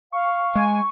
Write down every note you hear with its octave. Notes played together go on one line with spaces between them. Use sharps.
F5 C#6
G#3 G#5